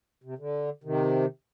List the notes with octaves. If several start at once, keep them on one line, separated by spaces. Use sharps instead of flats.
C3
D3
C3 D#3